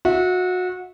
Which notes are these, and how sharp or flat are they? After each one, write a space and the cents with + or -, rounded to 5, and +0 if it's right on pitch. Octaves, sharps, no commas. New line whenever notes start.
F#4 -25 E5 -20